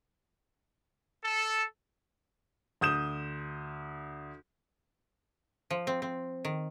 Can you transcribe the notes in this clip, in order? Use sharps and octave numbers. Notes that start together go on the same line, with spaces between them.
A4
D2 D#6 G6 E7
F3
C4
C4
D#3